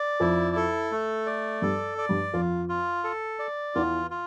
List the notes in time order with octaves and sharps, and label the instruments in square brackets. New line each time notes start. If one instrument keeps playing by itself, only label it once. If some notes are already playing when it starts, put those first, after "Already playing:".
Already playing: [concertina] D5
[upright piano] F2 F3 [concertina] E4
[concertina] A4
A3
D5
[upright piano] G2 G3 [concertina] A4
[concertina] D5
[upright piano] G2 G3
[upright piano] F2 F3 [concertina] F4
[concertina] F4
A4
D5
[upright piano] E2 E3 [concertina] F4
[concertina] F4